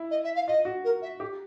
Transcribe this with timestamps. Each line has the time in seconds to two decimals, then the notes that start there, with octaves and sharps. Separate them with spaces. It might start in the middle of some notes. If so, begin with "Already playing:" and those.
Already playing: E4
0.10 D#5
0.24 E5
0.35 F5
0.47 F4 D#5
0.65 F#4
0.84 A#4
1.02 E5
1.20 G4